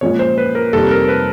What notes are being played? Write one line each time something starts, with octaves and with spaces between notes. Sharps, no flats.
A#2 F3 G#3 C#4 F4 C#5
C5
B4
A#4
F2 C3 D#3 G3 A#3 A4
A#4
B4